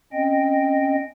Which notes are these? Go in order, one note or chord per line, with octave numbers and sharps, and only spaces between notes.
C4 C#4 D#5 G5